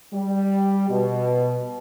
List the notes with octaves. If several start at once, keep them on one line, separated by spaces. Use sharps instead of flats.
G3
B2